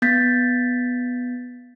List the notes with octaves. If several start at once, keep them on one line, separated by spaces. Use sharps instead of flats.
B3 G6 A6 B6